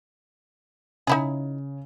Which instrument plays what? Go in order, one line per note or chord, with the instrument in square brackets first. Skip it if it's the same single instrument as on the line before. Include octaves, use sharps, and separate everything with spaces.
[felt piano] C#3 [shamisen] D#4 E4 G#4